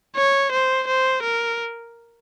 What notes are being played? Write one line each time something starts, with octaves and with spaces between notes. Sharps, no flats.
C#5
C5
C5
A#4